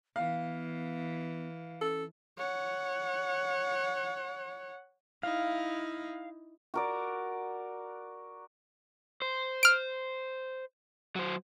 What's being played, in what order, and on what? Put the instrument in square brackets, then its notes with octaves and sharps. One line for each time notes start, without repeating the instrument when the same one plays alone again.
[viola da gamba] E3 [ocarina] B3 [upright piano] F5
[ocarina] C#4 [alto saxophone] A4
[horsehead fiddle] C#5 F#5
[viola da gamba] D#4 E4 [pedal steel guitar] F5
[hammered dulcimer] F#4 A#4 D5
[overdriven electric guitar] C5
[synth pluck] F6 D7
[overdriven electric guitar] F#3 C5